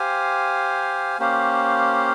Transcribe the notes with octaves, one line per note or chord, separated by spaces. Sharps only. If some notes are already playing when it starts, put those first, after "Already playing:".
Already playing: G4 C5 F5 G#5
A#3 C#4 G4 C5 F5